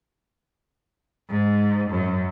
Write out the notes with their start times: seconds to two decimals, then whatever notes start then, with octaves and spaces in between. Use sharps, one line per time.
1.30 G#2
1.90 F#2